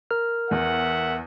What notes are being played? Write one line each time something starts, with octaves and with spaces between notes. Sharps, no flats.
A#4 F6
E2 E5 F#5